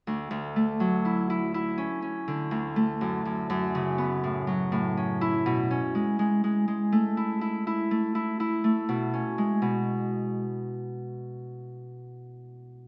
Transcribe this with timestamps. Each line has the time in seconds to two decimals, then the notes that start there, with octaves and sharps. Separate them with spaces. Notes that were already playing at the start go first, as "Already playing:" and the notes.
0.07 D2
0.31 D2
0.56 A3
0.80 F#3
1.05 E4
1.30 E4
1.54 E4
1.78 C#4
2.02 C#4
2.28 D3
2.51 D2
2.76 A3
3.01 F#2
3.25 F#2
3.50 F#2
3.75 C#3
3.98 B3
4.24 A2
4.47 F#3
4.72 A2
4.97 C#4
5.21 E4
5.46 B2
5.71 C#4
5.95 G#3
6.19 G#3
6.44 G#3
6.68 G#3
6.92 A3
7.17 E4
7.41 E4
7.67 E4
7.91 A3
8.15 E4
8.40 E4
8.64 A3
8.89 B2
9.14 C#4
9.38 G#3
9.62 B2